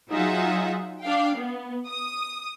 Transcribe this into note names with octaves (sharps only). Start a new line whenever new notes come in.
F#3 D#4 F4 G#4 E5 F#5
D4 F5 G5
B3
D#6